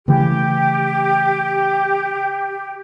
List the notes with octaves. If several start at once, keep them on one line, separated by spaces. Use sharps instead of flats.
C#3 E3 A3 G4